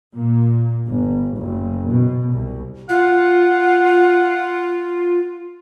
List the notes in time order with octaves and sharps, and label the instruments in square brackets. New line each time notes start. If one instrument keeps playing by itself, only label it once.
[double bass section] A#2
G1
F#1
B2
C2
[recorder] F4 [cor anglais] F#5